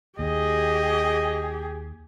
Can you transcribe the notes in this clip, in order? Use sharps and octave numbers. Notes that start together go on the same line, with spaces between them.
D#2 G4 G#4 D#5